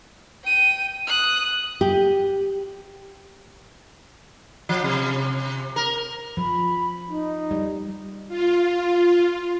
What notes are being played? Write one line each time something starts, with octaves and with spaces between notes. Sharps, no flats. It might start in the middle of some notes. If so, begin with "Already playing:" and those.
G5 D#7
D#6 F#6
G4
F3
C3
A#4
F3 B5
D#4
G3
F4